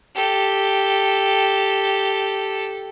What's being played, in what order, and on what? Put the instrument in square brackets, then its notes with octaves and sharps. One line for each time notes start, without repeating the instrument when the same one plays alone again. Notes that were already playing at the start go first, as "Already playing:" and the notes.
[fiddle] G4 A4